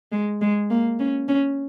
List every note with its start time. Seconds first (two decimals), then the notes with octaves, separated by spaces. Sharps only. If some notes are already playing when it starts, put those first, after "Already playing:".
0.12 G#3
0.42 G#3
0.70 A#3
0.99 C#4
1.28 C#4